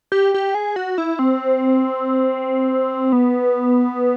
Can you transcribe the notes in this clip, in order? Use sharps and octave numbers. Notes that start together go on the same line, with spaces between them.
G4
G4
G#4
F#4
E4
C4
B3